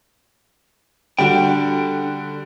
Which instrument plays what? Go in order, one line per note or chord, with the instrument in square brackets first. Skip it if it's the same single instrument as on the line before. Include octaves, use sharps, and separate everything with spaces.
[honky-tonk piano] D3 G3 F#4 [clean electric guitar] D4 G5